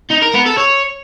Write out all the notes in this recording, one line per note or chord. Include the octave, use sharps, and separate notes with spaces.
D#4
A#4
B3
A4
C#5